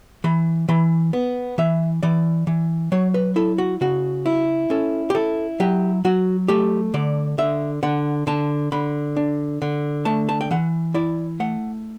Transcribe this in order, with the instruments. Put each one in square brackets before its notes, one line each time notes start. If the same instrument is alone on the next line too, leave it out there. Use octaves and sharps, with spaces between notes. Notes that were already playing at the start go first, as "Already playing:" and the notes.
[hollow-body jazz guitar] E3 B5
E3 B5
B3
E3 E5
E3 D5
E3
F#3 C#5
B4
E4 A4
F#4
C#3 F#4
E4
C#4 A4
G4
E4 A4
F#3 G4
F#3 F#4
A3 G4
D3 D5
D3 E5
D3 F#5
D3 A5
D3 B5
D4
D3
A3 A5
A5
G5
E3 F#5
E4 D5
A3 F#5